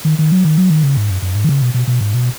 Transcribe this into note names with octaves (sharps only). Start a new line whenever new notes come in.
D#3
D#3
F#3
D#3
F#3
D#3
C#3
G#2
F#2
F#2
G#2
D#3
C#3
B2
B2
B2
G#2
B2